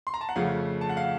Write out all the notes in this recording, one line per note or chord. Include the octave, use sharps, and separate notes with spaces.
C6
A#5
A5
F#5
F2 C#3 F3 A3 F5
A5
F#5
F5